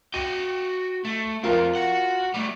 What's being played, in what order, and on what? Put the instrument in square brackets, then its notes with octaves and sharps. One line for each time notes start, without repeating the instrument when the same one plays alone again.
[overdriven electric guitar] F#4 G5 [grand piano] D#7
[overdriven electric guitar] A3
[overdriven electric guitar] F2 C4 [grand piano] F4 A#4
[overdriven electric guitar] F#4 F#5
G3 A3